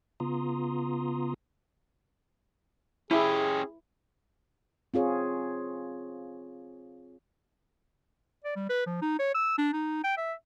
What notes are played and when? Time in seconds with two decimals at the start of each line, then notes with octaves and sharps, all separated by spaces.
0.20 C#3 B3 F4 A#5 C6 D#6
3.11 C#4 E4 G4 G#4
4.94 C4 F4 G#4 C#5
8.44 D5
8.56 G3
8.69 B4
8.86 F3
9.02 D#4
9.19 C#5
9.34 E6
9.58 D4
9.73 D#4
10.04 G5
10.17 E5